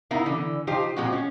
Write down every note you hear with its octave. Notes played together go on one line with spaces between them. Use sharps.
B3 D#4 E4 A#4 E5 F5
D3 E3
F3 D#4 F4 G4 C5
A#2 F3 G#3 C4 F#4
C#4